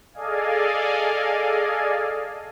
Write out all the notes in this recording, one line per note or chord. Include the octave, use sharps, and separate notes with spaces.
G#4 A4 D5 D#5 F5 G#5